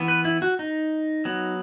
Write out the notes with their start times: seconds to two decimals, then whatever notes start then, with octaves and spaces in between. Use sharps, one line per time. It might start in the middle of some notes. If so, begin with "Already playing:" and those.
Already playing: E3 B3
0.08 B4
0.25 E4
0.42 F#4
0.59 D#4
1.25 F#3 B3